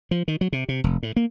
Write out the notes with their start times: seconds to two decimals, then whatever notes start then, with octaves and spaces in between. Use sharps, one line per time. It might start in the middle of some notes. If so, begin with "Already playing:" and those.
0.11 F3
0.28 D#3
0.41 F#3
0.53 C3
0.69 C3
0.84 F1
1.03 A2
1.16 A#3